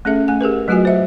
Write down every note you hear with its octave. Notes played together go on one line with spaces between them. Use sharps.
A3 C#4 G#4 A4 E5
A3 G#5
G4 G#4 A#4 B4
F#3 A3 F4 F#4 D#5 G#5
C5 E5